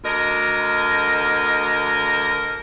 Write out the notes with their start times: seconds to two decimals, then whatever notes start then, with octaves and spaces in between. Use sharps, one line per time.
0.03 D2 A#4 D#5